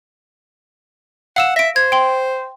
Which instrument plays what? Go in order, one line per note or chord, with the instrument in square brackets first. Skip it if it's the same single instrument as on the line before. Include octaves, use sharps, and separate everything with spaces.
[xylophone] F5 E6 E7 [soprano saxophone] F#5
[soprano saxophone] E5 [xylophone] A#6 D7
[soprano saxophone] C5 [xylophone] G#6
[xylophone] G5 C6